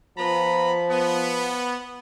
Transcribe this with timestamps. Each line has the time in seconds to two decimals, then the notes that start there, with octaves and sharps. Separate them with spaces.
0.18 F3 B3 A#5 B5
0.90 B3